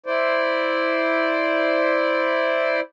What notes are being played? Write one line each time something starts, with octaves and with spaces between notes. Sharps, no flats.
E4 C5 D5